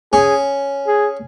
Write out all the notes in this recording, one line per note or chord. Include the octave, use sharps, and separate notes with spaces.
C#4 G#4
G#4